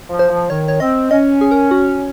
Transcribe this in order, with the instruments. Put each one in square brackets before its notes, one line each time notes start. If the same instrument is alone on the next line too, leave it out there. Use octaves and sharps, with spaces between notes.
[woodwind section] F3
[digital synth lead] C5
[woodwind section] F3
[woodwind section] D#3 [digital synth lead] C#5
[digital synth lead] C#5
[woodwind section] C4 [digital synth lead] D#5
[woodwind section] C#4 [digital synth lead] D#5
[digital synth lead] G#4
A#4
F#4